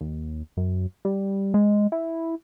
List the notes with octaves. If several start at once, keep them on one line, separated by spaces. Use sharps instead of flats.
D#2
F#2
G3
G#3
E4